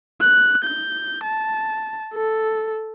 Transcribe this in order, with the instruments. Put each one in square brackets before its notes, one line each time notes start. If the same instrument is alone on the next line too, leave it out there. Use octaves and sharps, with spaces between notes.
[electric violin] F#6
G6
A5
A4